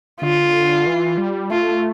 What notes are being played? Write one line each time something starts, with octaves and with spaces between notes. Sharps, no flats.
D3 F4
E3
G3
A3 F4